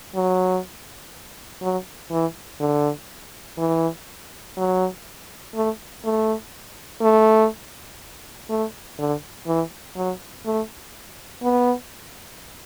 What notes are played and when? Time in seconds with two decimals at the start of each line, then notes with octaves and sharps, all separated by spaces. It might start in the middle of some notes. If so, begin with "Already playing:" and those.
0.15 F#3
1.62 F#3
2.11 E3
2.60 D3
3.58 E3
4.57 F#3
5.54 A3
6.04 A3
7.02 A3
8.49 A3
8.99 D3
9.47 E3
9.96 F#3
10.45 A3
11.43 B3